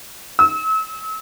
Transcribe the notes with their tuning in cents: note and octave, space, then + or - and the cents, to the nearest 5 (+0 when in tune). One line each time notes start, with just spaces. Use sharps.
E6 -35